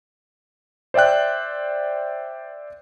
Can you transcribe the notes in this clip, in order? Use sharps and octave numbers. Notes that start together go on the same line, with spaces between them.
C5 D5 E5 G5 F#6